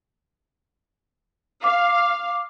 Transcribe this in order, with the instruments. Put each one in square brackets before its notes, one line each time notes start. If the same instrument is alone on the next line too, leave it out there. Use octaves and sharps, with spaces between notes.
[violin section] F5 [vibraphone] D6